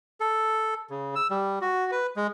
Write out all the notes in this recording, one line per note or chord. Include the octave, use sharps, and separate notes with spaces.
A4
C#3
E6
G3
F#4
B4
G#3